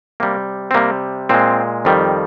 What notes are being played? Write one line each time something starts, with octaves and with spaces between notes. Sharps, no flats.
C3 G3 A#3
C4
C3 G3 A#3
A#2 G#3 C4
F2 D#3 G3